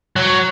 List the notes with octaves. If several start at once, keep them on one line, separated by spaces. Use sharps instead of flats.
F#3